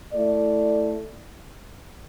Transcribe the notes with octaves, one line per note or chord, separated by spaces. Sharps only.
A3 E4 A4 D5